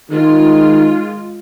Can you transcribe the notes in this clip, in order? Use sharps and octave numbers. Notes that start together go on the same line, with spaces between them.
D#3 G#3 F4